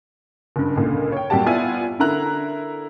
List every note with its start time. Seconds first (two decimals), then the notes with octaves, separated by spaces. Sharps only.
0.56 F#1 G2
0.76 C#2 A#2 D3
1.12 C#5 G5
1.30 F2 A#2 G3 F#4 G4 A5
1.46 B3 E4 F4 D5 G#5
2.00 D3 E4 A#4 A#5 F#6